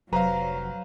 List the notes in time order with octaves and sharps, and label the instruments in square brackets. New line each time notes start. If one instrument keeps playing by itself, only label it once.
[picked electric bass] F1 [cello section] F#3 [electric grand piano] B4 C5 F5 [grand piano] A#5